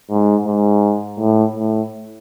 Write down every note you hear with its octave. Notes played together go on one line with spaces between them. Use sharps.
G#2
G#2
A2
A2